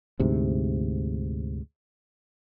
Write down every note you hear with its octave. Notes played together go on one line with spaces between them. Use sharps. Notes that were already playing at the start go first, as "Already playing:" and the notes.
D2 G#2 C3